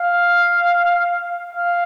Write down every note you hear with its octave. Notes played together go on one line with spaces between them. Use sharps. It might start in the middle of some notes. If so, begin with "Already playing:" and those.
Already playing: F5
F5